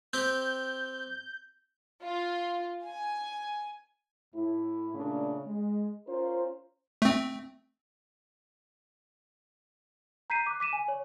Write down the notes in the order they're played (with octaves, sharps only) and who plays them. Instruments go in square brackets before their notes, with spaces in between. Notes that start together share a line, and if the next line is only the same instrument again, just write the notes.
[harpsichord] C4 G4 [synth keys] G6
[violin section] F4
G#5
[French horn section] A2 E4
A#2 C#3 A3 C#4 D4
G#3
C#4 F4 A#4 C5
[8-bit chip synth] A3 C4
[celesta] A#5 G6 B6 C7 D#7
D6 F#6
D6 B6 D#7 E7
G#5
C#5